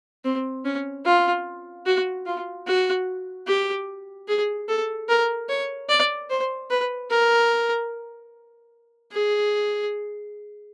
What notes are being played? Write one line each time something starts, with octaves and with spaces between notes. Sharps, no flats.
C4
C#4
F4
F#4
F4
F#4
G4
G#4
A4
A#4
C#5
D5
C5
B4
A#4
G#4